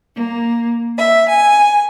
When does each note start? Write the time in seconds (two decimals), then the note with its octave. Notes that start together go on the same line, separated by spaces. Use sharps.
0.16 A#3
0.97 E5
1.29 G#5